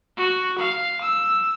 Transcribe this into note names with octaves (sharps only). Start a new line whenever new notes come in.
F#4
F5
E6